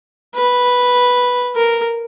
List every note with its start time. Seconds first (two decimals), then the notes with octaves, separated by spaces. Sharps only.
0.35 B4
1.56 A#4